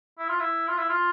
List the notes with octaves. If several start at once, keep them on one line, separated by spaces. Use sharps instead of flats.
E4
F4
E4
F4
E4
F4